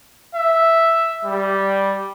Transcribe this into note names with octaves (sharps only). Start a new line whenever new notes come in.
E5
G3